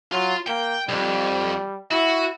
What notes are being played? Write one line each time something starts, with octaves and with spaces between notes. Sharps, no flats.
F#3 F4
A#3 G5
B1 F2 G3
E4 F#4